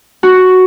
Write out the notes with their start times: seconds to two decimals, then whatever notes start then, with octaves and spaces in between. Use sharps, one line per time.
0.23 F#4